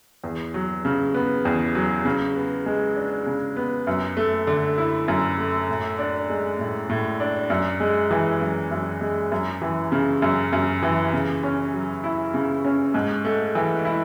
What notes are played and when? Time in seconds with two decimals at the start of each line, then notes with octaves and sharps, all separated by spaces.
0.24 E2
0.54 F#3
0.85 C#3
1.14 B3
1.45 E2
1.75 F#3
2.05 C#3
2.35 B3
2.66 G#3
2.96 D4
3.26 C#3
3.56 B3
3.87 F#2
4.17 A3
4.47 D3
4.78 E4
5.08 F#2
5.38 A3
5.69 A2
5.99 D4
6.29 G#3
6.59 A2
6.90 A2
7.20 D4
7.50 F#2
7.80 G#3
8.11 E3
8.41 F#2
8.71 F#2
9.01 G#3
9.32 F#2
9.62 E3
9.92 C#3
10.22 F#2
10.53 F#2
10.83 E3
11.13 C#3
11.43 C#4
11.74 F#3
12.04 E4
12.34 C#3
12.65 C#4
12.94 G#2
13.25 A3
13.55 E3
13.85 E4